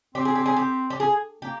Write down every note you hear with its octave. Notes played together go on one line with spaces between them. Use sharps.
C4 G4
G#4
G4
G#4
G4
G4
G#4
A#3 G4